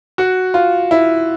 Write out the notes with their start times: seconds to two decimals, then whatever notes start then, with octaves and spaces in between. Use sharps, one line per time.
0.18 F#4
0.54 F4
0.91 E4